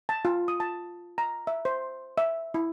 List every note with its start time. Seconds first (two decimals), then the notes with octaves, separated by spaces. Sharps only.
0.09 A5
0.25 F4
0.48 D#6
0.60 A5
1.18 A#5
1.47 E5
1.65 C5
2.18 E5
2.54 E4